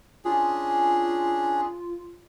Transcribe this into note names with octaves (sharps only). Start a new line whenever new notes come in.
C#4 D4 F4 G#4